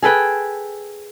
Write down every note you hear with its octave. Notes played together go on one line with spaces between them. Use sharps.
G#4 A4 B4 G5